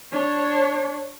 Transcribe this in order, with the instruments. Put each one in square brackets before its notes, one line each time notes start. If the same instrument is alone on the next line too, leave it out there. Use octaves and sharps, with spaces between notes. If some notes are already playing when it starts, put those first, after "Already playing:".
[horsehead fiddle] D4 C#5